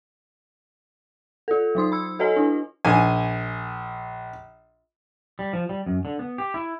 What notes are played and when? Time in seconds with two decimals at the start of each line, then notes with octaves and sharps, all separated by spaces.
1.48 F4 A4
1.75 F#3 D#4 C6 D#6
1.92 B5 E6
2.19 F#4 A4 C#5 D#5 G#5
2.36 D4 E4
2.85 A#1 G#5
5.39 G3
5.53 F3
5.69 G3
5.86 F#2
6.05 D3
6.19 B3
6.38 G4
6.54 E4